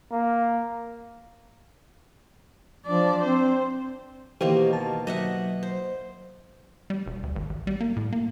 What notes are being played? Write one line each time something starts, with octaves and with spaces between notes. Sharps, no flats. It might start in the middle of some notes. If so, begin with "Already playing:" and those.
A#3
F3 D4 D5
C4 C5
B2 D#3 E3 A#3 G4 C5
A5
F#3 D#5 E5 F#5
C5
G3
E1
D2
G#1
A1
G3
A#3
A2
A#3